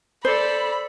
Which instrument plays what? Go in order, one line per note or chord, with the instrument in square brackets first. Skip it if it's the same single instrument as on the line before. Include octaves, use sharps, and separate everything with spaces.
[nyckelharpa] A4 D5 [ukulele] C5 [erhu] B5